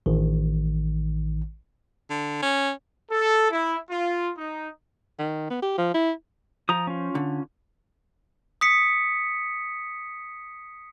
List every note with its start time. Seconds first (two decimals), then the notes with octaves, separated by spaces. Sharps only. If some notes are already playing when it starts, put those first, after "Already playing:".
0.06 A1 D#3
2.10 D3
2.42 C#4
3.11 A4
3.51 E4
3.91 F4
4.38 D#4
5.19 D#3
5.50 B3
5.62 G4
5.78 F3
5.94 E4
6.69 F3 A#5 D#6
6.87 C#4 F4
7.15 D3
8.61 D#6 B6 C#7